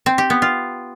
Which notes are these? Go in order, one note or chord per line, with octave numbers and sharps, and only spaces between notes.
C4
G4
B3
F4